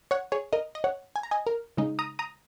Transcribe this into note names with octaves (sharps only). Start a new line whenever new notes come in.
C#5 F#5
G#4 C#5
A#4 D#5
D#5
C#5 F#5
G#5
A#5
D#5 G#5
A#4
C#3 G#3 D#4
A#5 D#6
A#5 D#6